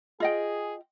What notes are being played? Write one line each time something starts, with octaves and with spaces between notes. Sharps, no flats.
F4 G#4 D#5 G5